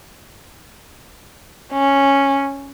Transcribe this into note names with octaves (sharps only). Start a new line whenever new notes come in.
C#4